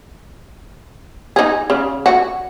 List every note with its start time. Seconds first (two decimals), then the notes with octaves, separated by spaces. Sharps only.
1.36 D#4 G#4
1.70 C#3
2.06 F#4